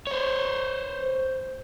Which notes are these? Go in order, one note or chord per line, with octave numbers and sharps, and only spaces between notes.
C5 C#5